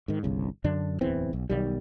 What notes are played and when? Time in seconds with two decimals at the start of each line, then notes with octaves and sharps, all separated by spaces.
0.08 G#2 D#3
0.23 G1 C2 C#3
0.64 F#2 D3 D4
1.01 D1 E2 E3 C4
1.33 B1
1.50 B1 D#3 G3